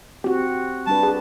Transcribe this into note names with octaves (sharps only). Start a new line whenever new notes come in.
C4 F#4 G4
G3 D4 B4 A5
G#4